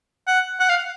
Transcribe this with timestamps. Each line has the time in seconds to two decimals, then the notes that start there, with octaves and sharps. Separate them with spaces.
0.27 F#5
0.60 F#5
0.69 F5